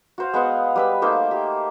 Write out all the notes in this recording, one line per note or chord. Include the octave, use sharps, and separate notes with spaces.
F#4 C5 F5
G#3 B3 F5 F#5
G3 B4 E6
A3 A#3 D#4 C5
G4